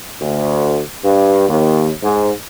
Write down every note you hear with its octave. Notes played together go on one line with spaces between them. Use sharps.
D2
G2
D#2
G#2